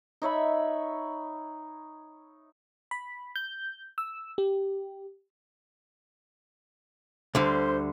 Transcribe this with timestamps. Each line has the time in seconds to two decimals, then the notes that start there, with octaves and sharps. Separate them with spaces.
0.22 D#4 C#5 E5 B5
2.91 B5
3.36 G6
3.98 E6
4.38 G4
7.35 D2 D3 G3 C5